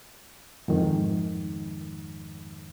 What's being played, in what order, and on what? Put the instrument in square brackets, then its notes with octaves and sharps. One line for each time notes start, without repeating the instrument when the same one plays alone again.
[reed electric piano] F2 G#2 D#3